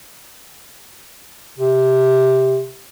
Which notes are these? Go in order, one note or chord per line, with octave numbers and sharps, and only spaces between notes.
C3